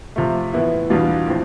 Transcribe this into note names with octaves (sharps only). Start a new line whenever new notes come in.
C3 F3 A3
A2 E3 B3 E4
E2 B2 G3 D4 F4
A2 F3 C4